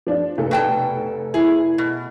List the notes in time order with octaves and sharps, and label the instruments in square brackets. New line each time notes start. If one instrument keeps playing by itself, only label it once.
[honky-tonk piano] F3 D4
F1 A4
[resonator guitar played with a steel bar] B2 G5 A5
[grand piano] E4 [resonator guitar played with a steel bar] G#4
[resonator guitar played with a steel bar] B2